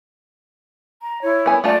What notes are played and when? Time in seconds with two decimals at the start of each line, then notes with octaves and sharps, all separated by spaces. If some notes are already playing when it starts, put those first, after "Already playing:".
1.01 A#5
1.21 E4 C#5
1.46 B3 G#5
1.64 A3 F4 D5 A5